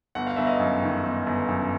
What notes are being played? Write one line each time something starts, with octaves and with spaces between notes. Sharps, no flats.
G1 F#5
F5
G1 E5
D#5 F5
F#2
D#3
G1
G1
F#2